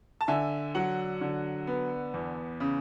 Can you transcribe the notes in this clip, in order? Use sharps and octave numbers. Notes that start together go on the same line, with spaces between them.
A5
D3 E5 G#5
F#3 F#5
D3
B3
E2
C#3